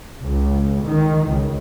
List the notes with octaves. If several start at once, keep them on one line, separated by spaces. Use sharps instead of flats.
C#2
D#3
C#2